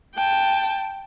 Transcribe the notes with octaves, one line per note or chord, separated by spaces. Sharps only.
G5 A5